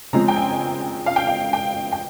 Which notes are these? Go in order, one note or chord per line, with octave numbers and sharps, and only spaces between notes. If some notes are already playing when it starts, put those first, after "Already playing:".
C#3 F3 G#3 C4 A#5
G5
G#5
F5
G5
F5
G5
G5